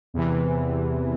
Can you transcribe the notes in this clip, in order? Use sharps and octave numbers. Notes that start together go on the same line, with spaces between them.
E2 C3 E3